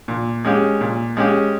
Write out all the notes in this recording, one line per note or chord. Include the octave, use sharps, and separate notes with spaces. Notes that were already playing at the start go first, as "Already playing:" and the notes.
A#2
G#3 C#4 G4
A#2
G#3 C#4 G4